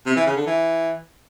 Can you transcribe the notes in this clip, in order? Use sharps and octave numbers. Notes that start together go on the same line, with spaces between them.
C3
E3
C#3
D3
E3